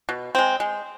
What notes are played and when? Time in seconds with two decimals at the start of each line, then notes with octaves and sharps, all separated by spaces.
0.09 B2
0.35 G#3 C4
0.60 G#3